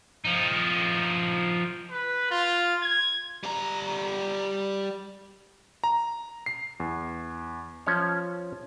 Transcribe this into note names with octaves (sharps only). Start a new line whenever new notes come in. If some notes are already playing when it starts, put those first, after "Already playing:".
F3 D#4
B4
F4
G#6
G3 A#5
A#5
C7
E2
F3 C#4 C#5